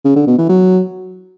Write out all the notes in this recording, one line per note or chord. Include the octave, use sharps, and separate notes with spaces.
C#3
D3
B2
E3
F#3